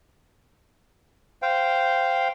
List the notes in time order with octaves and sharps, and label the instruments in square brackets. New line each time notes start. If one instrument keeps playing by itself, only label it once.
[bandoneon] C5 F5 G5